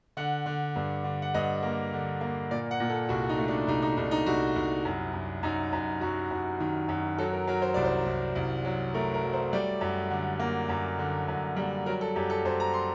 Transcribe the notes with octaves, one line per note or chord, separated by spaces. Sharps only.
D3 F#5
D3
G2
D3
F#5
G2 D#5
A#3
D3
A#3
A#2 D5
F#5
A#2
A4
C2 F#4
D#4
A3
D4
C2 D#4
D#4
C2 D#4
D#4
C2 F#4
C2
F#2
F#2
F#2 D#4
F#2
F#2 F#4
F#2
D#3
F#2
F#3 A4
A#4
F#3 A#4
C5
C2 D5
C5
C2
C2
F#3
A3 A#4
A#4
F#3
C5
G3 D5
F#2
D3
A#3
F#2
D3
F#2
G3
F#3 A#4
A4
F#2 G4
A4
F#2 C5
A#5
C6